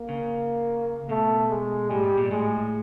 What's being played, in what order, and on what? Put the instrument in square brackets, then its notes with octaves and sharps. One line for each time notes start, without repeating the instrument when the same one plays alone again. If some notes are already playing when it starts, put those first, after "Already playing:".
Already playing: [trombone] A#3
[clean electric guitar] C#3
[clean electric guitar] B2 [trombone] A3
[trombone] G#3
[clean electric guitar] A2 [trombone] G3
[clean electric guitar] G#2
A#2
[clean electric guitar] A2 [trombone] G#3